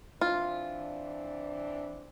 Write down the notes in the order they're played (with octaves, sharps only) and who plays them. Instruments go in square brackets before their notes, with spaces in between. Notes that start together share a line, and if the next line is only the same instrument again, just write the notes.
[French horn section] E3 C4 D4 [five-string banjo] F4